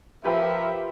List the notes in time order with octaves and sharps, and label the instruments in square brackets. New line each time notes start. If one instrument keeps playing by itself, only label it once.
[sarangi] F3 [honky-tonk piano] G4 B4 G5 [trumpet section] A#4 E5